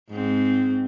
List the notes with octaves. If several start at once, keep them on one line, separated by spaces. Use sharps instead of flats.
G#2 C4